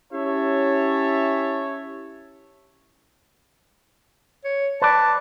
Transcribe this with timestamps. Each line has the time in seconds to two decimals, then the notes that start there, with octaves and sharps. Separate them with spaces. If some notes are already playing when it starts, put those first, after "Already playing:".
0.12 C#4 E4 G4 C#5 E5 A5
4.45 C#5
4.82 B4 D5 A5